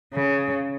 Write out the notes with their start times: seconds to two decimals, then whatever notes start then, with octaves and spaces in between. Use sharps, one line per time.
0.14 C#3